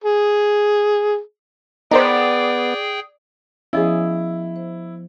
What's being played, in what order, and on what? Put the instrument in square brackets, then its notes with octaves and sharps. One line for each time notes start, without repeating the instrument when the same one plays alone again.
[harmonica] G#4
[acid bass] B3 [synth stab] D#4 A#4 C5 [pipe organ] G#4 G5 [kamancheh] D5
[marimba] F3 B3 D#5 [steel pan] C#4 G#4 [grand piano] E4
[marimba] C5